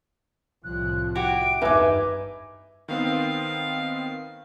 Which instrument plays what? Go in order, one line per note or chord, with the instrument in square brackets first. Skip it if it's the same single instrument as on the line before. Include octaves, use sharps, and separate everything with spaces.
[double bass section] C2 A2 F3 [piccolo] F#6
[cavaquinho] E4 F#4 G4 [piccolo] D7
[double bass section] G#1 E2 G2 [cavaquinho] D#4 D6 [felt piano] B4 E5 [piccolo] G#5
[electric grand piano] D#3 B3 C4 [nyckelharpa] F5